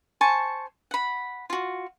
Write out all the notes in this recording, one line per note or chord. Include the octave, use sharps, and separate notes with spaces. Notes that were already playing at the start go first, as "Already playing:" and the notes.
C5 G#5 A5 C#6
F#5 B5
F4 F#4